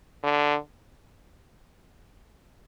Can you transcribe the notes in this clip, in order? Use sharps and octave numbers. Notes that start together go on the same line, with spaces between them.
D3